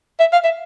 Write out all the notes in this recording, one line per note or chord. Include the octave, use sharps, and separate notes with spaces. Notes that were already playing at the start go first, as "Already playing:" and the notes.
E5
F5
E5